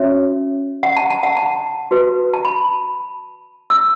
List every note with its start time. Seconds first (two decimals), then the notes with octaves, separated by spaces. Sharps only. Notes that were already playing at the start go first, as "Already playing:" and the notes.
Already playing: C#4 F#4 C#5 E5
0.83 F#5
0.97 A5
1.10 A5
1.23 F#5
1.37 A5
1.91 F#4 B4
2.34 A5
2.45 B5
3.70 E6